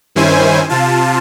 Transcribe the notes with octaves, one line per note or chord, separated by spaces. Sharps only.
G2 D#3 C#4 E4 C5 G#5
C3 F4 A5